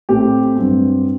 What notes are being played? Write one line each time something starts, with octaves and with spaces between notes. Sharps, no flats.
A2 A3 C4 G4
G2 F#3 C4